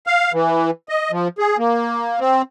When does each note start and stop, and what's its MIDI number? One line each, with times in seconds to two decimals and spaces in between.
0.07 0.32 77
0.33 0.70 52
0.89 1.11 75
1.12 1.28 53
1.38 1.57 68
1.58 2.19 58
2.20 2.42 60